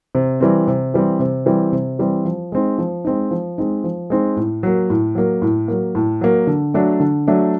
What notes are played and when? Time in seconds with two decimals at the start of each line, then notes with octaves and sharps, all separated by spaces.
0.15 C3
0.40 E3 G3 C4
0.67 C3
0.94 E3 G3 C4
1.20 C3
1.46 E3 G3 C4
1.72 C3
1.99 E3 G3 C4
2.25 F3
2.52 G#3 C4 D#4
2.78 F3
3.05 G#3 C4 D#4
3.31 F3
3.58 G#3 C4 D#4
3.84 F3
4.10 G#3 C4 D#4
4.36 A2
4.63 F#3 A#3
4.90 A2
5.15 F#3 A#3
5.42 A2
5.68 F#3 A#3
5.95 A2
6.21 F#3 A#3
6.47 D3
6.74 F#3 A3 D4
7.00 D3
7.27 F#3 A3 D4